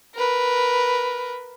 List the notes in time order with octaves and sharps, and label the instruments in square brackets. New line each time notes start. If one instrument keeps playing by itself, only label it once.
[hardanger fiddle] A#4 B4